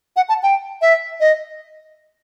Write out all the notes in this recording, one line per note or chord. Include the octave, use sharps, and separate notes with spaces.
F#5
A5
G5
E5
D#5